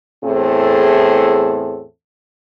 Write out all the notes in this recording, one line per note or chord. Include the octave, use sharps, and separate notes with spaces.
E2 A2 C4 G#4 A4